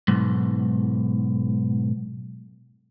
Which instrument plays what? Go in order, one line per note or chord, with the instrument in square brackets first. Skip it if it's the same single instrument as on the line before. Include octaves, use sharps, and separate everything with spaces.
[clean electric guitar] B1 G#2